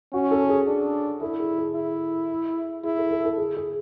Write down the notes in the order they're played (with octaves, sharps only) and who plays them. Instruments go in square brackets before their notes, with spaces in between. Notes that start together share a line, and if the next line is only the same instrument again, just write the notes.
[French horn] C#4 [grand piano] F#4
[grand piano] A4
G#4
[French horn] D4
[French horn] E4 [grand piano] A4
[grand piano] G#4
G#4
[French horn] E4
[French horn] E4 [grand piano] G#4
[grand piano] A4
A4
A4
G#4
G#4